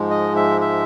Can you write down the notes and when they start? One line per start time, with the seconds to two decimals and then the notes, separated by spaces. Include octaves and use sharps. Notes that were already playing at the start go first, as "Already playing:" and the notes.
Already playing: G#2 F3 G#3
0.11 D#5
0.36 E5
0.61 E5